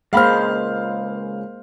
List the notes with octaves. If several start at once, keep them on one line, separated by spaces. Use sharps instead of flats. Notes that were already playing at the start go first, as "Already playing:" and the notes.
C#2 G#3 A#3 C5 F5 B5 F6